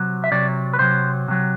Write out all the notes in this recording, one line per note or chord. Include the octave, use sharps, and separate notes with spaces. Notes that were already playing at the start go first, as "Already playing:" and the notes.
Already playing: C3 F#3
E5
C3 F#3 D5
B4
C3 F#3 C5
C3 F#3